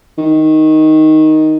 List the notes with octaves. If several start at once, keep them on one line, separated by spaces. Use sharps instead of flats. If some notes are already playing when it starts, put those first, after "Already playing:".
D#3